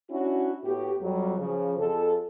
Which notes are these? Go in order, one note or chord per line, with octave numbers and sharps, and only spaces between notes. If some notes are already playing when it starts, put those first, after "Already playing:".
C#4 D4 E4 F#4
A2 B3 F#4 G4
F2 F#3 G3
C#3 F3
F2 F3 G#4 A4